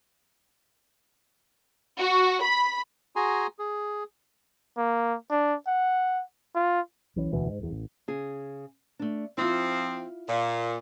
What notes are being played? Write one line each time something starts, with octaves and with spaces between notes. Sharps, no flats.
F#4
B5
F#4 G#4 G#5 A#5 C6
G#4
A#3
D4
F#5
F4
B1 E3 C#4
E1 D2 B2 E3
G#2
D1 E2
A1
C#3 G#4
A3 D4
F3 C4 E4 F4
A#2